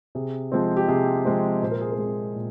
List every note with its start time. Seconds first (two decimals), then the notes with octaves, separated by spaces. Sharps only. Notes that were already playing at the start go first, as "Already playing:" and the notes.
0.15 C3 G#4
0.52 F3 G#3 C4
0.77 G4
0.88 C3 G#4
1.25 F3 G#3 C4
1.62 A#2 C5
1.71 A#4
1.81 G#4
1.91 A#4
1.99 G#3 C4
2.36 A#2